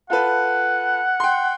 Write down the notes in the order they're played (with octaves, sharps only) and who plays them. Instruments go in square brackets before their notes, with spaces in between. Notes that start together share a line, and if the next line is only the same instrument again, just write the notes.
[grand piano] F4 A4 B4 [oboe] F#5
[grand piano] G5 C6